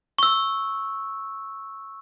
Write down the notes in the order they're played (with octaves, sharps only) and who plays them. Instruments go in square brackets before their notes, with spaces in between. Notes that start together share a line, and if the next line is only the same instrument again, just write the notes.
[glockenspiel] C#6 E6